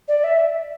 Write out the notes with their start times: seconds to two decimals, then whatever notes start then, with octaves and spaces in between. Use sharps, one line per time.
0.08 D5
0.24 E5